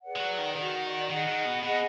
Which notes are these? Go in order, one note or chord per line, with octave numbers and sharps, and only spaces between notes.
G#4 B4 D5 F#5
G#3
F#3
D#3
D#3 F#4 D5 F#5
D#3 G#4 D#5 F#5
D#3
B2
B2 G#4 D#5 F#5